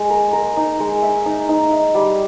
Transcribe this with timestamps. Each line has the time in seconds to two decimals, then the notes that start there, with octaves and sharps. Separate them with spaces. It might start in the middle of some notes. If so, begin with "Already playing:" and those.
Already playing: G#3
0.10 A#4
0.33 A#4
0.57 D#4
0.80 G#3
1.02 E5
1.26 D#4
1.49 D#4
1.72 E5
1.95 G3